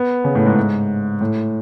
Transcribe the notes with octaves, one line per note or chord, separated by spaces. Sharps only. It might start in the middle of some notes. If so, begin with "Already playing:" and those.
Already playing: B3
C#3
A2
G#2
A2